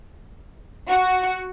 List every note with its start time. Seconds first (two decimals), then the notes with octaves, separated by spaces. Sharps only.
0.89 F#4 F#5